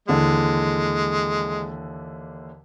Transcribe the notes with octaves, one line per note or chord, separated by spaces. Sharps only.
D#2 D3 E3 G#3